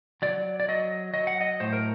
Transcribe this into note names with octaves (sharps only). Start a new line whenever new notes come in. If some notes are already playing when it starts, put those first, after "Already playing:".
F#3 D5
D5
F#3 D#5
F#3 D#5
F#5
D#5
A2 C5
A#4